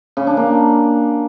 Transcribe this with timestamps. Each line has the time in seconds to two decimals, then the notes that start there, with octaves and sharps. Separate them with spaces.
0.17 C#3
0.27 D4
0.37 A#3